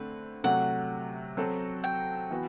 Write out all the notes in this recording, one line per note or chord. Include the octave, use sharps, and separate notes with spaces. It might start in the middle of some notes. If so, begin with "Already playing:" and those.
Already playing: D3 A3 C4 B4
C3 F#3 A3 F#5
F#3 C4 F#4 A4
G5
E3 B3 F#4